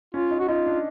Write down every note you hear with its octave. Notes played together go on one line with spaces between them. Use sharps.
C#4 F4
D#4
F#4
D#4 F4
D4